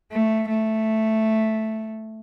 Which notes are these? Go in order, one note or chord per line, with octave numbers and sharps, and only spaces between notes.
A3
A3